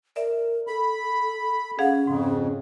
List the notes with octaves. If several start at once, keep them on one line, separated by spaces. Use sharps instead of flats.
A#4 D5 E5
A4 B5
C#4 G#4 F5 F#5
F2 G#2 C#3